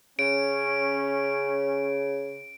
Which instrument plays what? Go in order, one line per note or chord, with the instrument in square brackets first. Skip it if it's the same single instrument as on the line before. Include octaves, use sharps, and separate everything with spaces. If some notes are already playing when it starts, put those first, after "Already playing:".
[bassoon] C#3 [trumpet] C#4 [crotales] D7